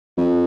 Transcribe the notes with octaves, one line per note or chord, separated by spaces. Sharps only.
F2